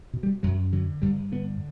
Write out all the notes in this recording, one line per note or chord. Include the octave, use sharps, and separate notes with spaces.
B2
G3
F#2 F#3
D3 F#3
G2 G3
D3 B3